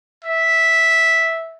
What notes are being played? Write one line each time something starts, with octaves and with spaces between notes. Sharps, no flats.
E5